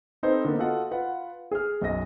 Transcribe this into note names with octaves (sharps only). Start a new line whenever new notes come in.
C4 D#4 A4 B4 C5
D3 A#3 B3
F4 F#4 A4 D#5 F5 F#5
F4 B4 F#5
G#4 F6
B1 F#2 D#5 A#6